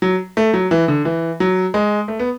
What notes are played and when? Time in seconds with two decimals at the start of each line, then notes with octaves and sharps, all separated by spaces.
0.02 F#3
0.37 A3
0.53 F#3
0.71 E3
0.88 D3
1.05 E3
1.40 F#3
1.74 G#3
2.08 A3
2.19 B3